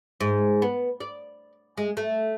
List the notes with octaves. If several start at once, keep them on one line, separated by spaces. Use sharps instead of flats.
G#2
B3
D5
G#3
A3